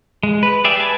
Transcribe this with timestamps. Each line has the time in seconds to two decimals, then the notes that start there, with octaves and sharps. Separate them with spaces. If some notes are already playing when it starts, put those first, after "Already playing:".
0.23 G#3
0.43 B4
0.64 G4 G#4 D5 E5
0.80 B4 G#5 A5